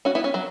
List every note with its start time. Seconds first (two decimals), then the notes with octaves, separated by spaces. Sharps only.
0.05 C#4 F#4
0.15 B3 E4
0.24 C#4
0.34 F#3